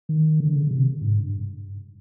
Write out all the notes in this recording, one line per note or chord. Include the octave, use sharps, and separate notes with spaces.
D#3
D3
C#3
C#3
C3
G#2
G2